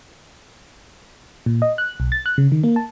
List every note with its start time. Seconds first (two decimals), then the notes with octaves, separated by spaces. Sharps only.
1.46 A#2
1.62 D#5
1.78 F#6
2.00 B1
2.12 A6
2.26 F#6
2.38 C#3
2.52 D#3
2.64 A#3
2.76 A5